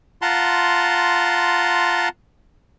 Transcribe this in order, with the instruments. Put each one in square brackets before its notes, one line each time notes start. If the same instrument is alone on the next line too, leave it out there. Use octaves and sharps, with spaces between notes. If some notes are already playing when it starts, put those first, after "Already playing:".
[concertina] F4 F#5 A5 A#5 C6